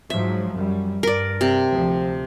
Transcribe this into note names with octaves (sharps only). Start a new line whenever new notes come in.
G#2 F3 F#3 E5
F#2 G3
G2 A#4 D5
C3
D2 F3